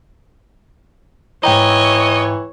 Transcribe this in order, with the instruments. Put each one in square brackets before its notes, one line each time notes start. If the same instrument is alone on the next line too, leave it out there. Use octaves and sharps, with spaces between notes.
[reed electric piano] G#2 G5 A#5 [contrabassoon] E3 [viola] C#5 [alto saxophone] D#5